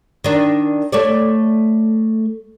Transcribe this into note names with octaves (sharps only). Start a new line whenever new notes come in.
D#3 D4
A3 C#5 D5